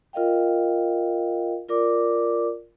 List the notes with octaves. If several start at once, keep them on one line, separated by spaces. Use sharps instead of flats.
F4 A#4 D#5 F5 G5
F4 A#4 D5 D6